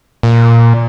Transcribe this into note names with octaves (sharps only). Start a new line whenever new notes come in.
A#2